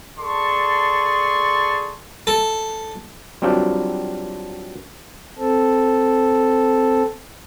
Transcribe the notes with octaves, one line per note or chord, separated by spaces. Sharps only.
G#4 A4 D5 A5 C6 C#6
A4
F#3 G3 C4 D4 F4 G4
C4 A4